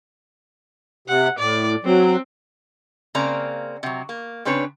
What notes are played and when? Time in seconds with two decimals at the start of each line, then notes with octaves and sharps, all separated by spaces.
1.08 C3 F#5
1.38 A2 D5
1.85 F#3 C4
3.15 C#3 A#3 C4 D5 A#5
3.83 C3 F#3
4.09 A#3
4.45 C#3 C4 D4 B4 C#5